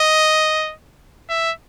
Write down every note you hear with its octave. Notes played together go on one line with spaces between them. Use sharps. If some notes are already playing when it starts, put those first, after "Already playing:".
Already playing: D#5
E5